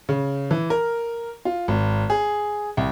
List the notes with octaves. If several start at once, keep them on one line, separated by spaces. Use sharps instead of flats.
C#3
E3
A#4
F4
G#1
G#4
C2